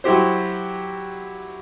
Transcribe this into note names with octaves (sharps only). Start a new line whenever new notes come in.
F#3 E4 F#4 G4 C5